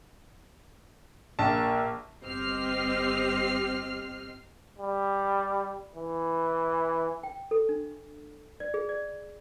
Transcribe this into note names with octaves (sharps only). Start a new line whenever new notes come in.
A#1 A#3 A5
G1 C4 G4 D#5 F6 C7
G3
E3
G5
A4
D4
D5
G#4
D5